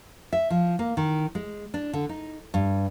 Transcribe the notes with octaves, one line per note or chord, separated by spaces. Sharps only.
E5
F3
A#3
D#3
G#3
D4
D3
D#4
G2